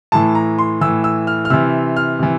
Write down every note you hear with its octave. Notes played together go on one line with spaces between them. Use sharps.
A2 E3 A5
A#5
C6
A2 E3 E6
E6
F6
F6
C3 E3 E6
F6
C3 E3